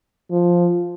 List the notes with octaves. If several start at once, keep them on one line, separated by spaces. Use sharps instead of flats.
F3